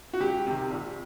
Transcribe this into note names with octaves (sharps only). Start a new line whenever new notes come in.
F#4
C#2 G4
C3 D#3
A#1